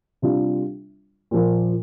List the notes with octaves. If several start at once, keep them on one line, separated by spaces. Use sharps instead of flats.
C3 G3 D4 F4
A#2 F3 A#3